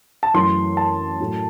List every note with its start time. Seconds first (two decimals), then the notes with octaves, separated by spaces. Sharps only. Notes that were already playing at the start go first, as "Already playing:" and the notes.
0.23 A5
0.34 F#2 E3 A3 C6
0.77 A5
1.20 A2 F#3 A3